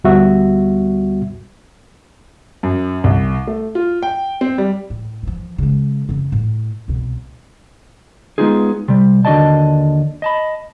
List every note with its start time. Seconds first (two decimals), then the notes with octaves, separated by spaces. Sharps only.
0.04 D2 G3 B3 F#4 E5
2.63 F#2
3.04 C2
3.47 A3
3.75 F4
4.03 G5
4.41 C4
4.58 G3
4.90 A2
5.23 E3 F3
5.58 C#3 G#3
6.09 F2 C#3
6.32 A2
6.88 C2 B2
8.38 G#3 A#3 B3 D#4 F4 G#4
8.88 C3 G3
9.25 D#2 D3 F#4 D5 D#5 A5
10.22 D#5 A5 B5